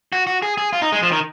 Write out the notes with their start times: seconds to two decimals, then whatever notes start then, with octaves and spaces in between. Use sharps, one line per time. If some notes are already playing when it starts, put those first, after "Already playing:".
0.13 F#4
0.27 F#4
0.42 G#4
0.58 G#4
0.73 F4
0.82 D#4
0.92 G#3
1.03 F3
1.12 D#3